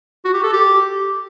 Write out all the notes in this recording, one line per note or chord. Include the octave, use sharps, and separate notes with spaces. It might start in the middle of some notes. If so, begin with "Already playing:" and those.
F#4
G4
A4
G4